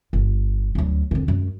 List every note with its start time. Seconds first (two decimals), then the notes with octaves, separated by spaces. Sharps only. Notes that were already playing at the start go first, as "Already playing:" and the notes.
0.13 G1
0.75 D2 F#3
1.11 F2 D3
1.28 F#2 G#3